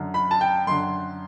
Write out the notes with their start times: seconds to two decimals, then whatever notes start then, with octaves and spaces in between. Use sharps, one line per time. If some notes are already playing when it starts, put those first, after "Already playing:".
Already playing: F#2 D3
0.14 B5
0.31 A5
0.41 G5
0.67 F#2 D3 C6